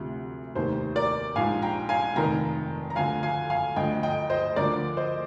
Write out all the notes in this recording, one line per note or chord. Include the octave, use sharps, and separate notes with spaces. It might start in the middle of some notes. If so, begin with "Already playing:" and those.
Already playing: D2 C3 F3
F1 D#2 D#3 C5
A#4 D5
A#1 G#2 F3 F5 G#5
G5 A#5
F5 G#5
F1 F2 D#3 G5 A#5
A#5
D2 D3 F3 F5 G#5
F5 G#5
F5 G#5
D2 D3 F3 D#5 G5
D#5 G5
C5 D#5
D2 D3 F3 A#4 D5
C5 D#5